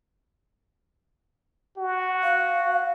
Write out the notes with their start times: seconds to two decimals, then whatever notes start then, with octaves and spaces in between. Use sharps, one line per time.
1.78 F#4
2.23 F5